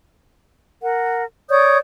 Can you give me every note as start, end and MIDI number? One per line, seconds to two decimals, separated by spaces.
0.82 1.24 70
0.82 1.24 78
1.49 1.78 73
1.49 1.78 74
1.49 1.78 87
1.49 1.78 91